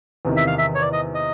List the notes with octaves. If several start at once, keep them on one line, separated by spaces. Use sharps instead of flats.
E2 C3 D#3
E5
F5
E5
C#5
D5
D#5
D#5